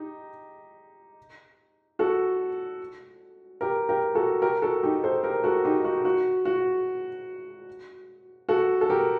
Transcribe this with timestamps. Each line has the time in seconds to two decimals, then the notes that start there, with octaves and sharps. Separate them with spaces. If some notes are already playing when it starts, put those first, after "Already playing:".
Already playing: D#4 G4
1.99 F#4 A4
3.61 G4 A#4
3.89 G4 A#4
4.15 F#4 A4
4.42 G4 A#4
4.62 F#4 A4
4.83 D#4 G4
5.04 A4 C5
5.23 G4 A#4
5.44 F#4 A4
5.64 D#4 G4
5.84 F#4
6.05 F#4
6.45 F#4
8.49 F#4 A4
8.81 A4
8.90 G4 A#4